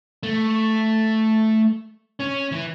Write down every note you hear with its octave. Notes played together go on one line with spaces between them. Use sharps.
A3
C#4
E3